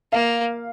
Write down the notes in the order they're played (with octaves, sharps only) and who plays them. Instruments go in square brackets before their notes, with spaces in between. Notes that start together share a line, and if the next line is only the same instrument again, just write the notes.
[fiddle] A#3 [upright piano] F5